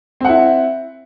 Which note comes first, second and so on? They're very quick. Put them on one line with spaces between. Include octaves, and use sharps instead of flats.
C4 F#5 E4